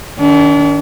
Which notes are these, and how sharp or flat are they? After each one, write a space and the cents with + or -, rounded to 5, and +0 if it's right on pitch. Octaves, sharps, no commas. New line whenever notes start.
D#3 +0 D4 -45